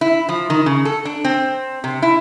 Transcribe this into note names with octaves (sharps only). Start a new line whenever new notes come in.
E4
F3
D#3
C#3
A4
D4
C4
C3
E4